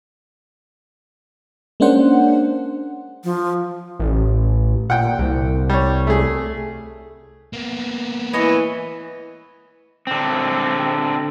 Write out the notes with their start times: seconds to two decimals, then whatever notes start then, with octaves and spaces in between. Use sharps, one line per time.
1.80 G#3 A#3 C#4 D4 C5 F#5
3.24 F3
3.99 A1
4.90 A#2 F#5 G5
5.19 C2
5.70 G3 C#5
6.07 A3 G#4
7.53 A#3 B3
8.33 E3 B4 C#5 D#5 G#5
10.07 D3 C4